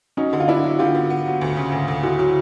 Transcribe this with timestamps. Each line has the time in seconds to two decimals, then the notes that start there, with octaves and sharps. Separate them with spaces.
0.17 F#3 C#4 D#4
0.33 D3
0.40 F4
0.48 B3 D4 E4
0.64 F#3
0.79 D3 F4 G4
0.95 B3
1.10 B3
1.26 F#3
1.41 D2
1.57 C#3
1.72 D2
1.88 D2
2.03 D2 E4 F#4
2.19 F#3